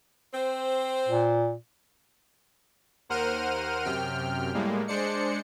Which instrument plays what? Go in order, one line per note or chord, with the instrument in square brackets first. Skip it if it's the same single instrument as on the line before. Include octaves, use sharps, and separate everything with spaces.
[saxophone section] C4 C5
[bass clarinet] A#2
[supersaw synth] D#2 A#4 C5 F#5 F6 D#7
F#2 C3 G5 F6
A2 G3 G#3 A#3
G#3 D4 C5 D5 C#7